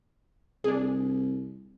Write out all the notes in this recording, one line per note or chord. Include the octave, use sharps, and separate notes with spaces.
C2 D4 G#4